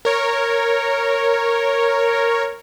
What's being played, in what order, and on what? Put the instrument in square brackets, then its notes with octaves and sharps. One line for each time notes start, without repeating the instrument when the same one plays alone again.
[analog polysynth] A#4 C#5